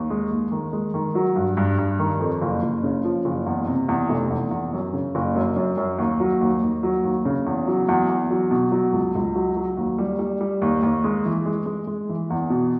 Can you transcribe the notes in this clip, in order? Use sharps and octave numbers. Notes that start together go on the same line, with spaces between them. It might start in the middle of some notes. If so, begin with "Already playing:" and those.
Already playing: D#2
G#3
D#2
D#3
G#3
D#3
F#3
G2
G2
G2
D#3
F2
F#1
F#1
C#3
F3
F#1
E2
C3
E2
F1
E2
E2
F#2
C#3
F#1
F#2
F#2
F#2
D#2
F#3
D#2
D#2
F#3
D#2
C#3
E2
F#3
E2
E2
F#3
B2
F#3
C#2
C#2
F#3
F#3
D#2
G3
G3
G3
D#2
D#2
G#3
E3
G#3
G#3
G#3
E3
E2
B2